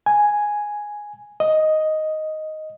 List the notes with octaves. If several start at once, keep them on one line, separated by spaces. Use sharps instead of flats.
G#5
D#5